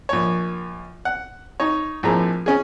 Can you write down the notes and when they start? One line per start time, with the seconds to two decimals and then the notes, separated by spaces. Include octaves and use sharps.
0.09 A#1 C#5
1.05 F#5
1.60 D#4 C#5
2.03 A#1 A2 C4 G#4 A#5
2.46 C#4 G#4